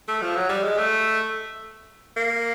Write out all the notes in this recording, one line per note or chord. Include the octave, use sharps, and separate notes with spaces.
A3
F3
F#3
G3
G#3
A3
A#3